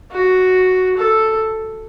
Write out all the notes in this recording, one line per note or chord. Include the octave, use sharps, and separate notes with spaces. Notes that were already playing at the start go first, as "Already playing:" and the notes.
F#4
A4